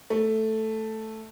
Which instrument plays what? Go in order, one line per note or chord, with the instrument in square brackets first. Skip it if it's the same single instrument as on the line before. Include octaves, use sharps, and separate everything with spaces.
[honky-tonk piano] A3